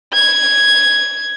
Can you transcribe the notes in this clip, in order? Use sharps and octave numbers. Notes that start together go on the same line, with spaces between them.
G#6